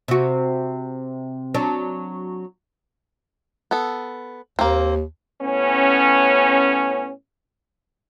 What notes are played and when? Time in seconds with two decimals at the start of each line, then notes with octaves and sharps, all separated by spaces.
0.08 C3 F#4
1.54 F#3 D4
3.71 B3 A4
4.59 D#2 A#3 C4
5.41 A2 B3 C#4